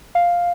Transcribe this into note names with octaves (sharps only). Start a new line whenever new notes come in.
F5